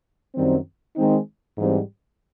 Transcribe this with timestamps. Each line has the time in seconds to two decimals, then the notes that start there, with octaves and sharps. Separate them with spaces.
0.35 F#2 D#3 G3 C4
0.96 D#3 G#3 C4 D#4
1.57 G#2 E3 G3 C4